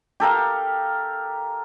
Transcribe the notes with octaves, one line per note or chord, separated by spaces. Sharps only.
G4 A4 A#4 F5